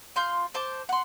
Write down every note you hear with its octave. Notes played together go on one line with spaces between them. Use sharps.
F4 C6 G6
C5 A5 D6
F#5 C6